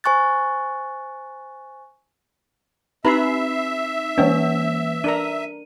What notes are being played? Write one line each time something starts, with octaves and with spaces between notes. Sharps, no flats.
C5 G#5 C#6 F#6 A6
C4 D#4 B4 E5 A#5 B5 C7
E3 A#3 C#4 B4
D4 A#4 A#5 D#7